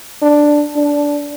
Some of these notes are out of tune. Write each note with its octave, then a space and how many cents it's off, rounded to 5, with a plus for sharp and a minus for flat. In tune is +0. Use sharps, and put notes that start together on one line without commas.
D4 +5
D4 -15